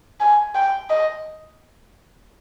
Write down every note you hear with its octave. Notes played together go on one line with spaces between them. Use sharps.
G#5
G5
D#5